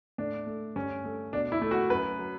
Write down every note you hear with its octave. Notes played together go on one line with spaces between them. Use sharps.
A2 D4
A3
G2 C#4
A3
B2 D4
E4
A3
F#4
F#2 B4
F#3